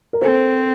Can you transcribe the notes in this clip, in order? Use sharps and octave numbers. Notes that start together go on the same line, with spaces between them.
A#4
C4 A4 C5